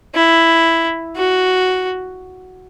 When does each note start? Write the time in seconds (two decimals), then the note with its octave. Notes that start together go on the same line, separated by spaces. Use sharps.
0.15 E4
1.17 F#4